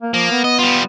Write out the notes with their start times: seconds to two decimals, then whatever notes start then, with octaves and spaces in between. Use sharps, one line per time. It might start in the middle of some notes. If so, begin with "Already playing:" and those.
0.02 A#3
0.14 F3 A#3
0.31 B3
0.44 D#5
0.59 G3 F4